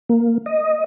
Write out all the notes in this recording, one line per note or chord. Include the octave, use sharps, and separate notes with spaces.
A#3
D#5